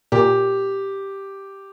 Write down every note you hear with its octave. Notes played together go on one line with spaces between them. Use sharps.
A#2 G4